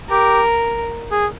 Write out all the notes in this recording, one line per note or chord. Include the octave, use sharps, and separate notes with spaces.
G4 A#4
G#4